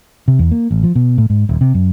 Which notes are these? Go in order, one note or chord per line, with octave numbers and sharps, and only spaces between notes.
C3
E2
A#3
A1
F3
B2
A2
G#2
D#1
C3
F#2